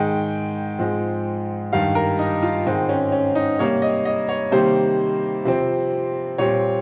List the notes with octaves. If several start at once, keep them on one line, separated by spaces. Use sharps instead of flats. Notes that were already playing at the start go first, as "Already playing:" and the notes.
Already playing: G#2 D#3 G#3 G5
G#2 F3 G#3 C4
G2 D#3 G3 F5
A#4
D#4
F4
G#2 D#3 G#3 C4
C#4
C#4
D#4
C3 G3 A#3 C#5
D#5
D#5
C#5
C3 D#3 G3 A#3 C5
C3 F3 C4
A#2 G3 C4 C#5